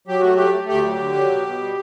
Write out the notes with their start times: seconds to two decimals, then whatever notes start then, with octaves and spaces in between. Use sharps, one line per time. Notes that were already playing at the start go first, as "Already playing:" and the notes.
0.07 F#3 G4
0.21 A3 F#4
0.35 A3 G4
0.54 A3
0.68 D2 G4
0.85 F#3
0.99 D3
1.16 F#3
1.30 B2
1.45 B2
1.61 G3